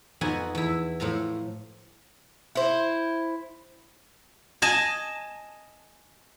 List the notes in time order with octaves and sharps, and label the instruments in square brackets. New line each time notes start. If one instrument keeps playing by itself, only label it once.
[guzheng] F2 B3 D#4 F#4 G#5
E2 E4
A2 F3 F5 A#5
[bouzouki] E4 C5
[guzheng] D#5 G#5 A5